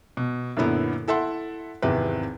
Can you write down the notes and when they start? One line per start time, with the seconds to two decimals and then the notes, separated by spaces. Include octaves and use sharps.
0.17 B2
0.57 F#2 A#2 D3 B3 E4
1.08 E4 A4 E5 F#5 C6
1.82 G#1 E2 C3 B4